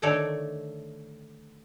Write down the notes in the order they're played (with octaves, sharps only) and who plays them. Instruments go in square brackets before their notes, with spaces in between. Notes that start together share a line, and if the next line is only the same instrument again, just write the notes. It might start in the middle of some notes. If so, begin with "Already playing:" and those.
[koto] D3 D#3 A3 A4 C#5 D5